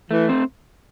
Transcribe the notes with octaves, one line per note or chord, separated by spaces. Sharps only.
E3 A3
C4